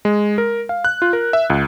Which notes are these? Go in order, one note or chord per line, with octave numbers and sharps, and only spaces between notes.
G#3
A#4
F5
F#6
F4
A#4
E5
C#2